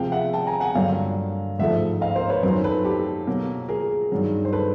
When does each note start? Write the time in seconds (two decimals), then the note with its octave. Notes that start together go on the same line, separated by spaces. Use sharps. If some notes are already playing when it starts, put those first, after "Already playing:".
Already playing: C3 F3 G#3 F5 G5
0.12 E5 F#5
0.33 G5 A5
0.47 G#5 A#5
0.61 F#5 G#5
0.75 G2 D3 F#3 A#3 F5 G5
1.59 G#2 F3 A3 E5 F#5
2.01 D#5 F5
2.16 A#4 C5
2.29 B4 C#5
2.43 F#2 D#3 F#3 A#4 C5
2.64 A4 B4
2.85 G4 A4
3.27 B2 F#3 A#3
3.69 G#4 A#4
4.12 G2 D#3 F#3
4.45 C5
4.53 A4 B4